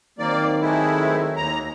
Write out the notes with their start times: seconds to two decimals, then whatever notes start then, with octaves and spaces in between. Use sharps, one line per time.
0.19 D#3 F#3 A#3 C4 D5
0.61 G#3 A3 E4
1.37 D#2 A#5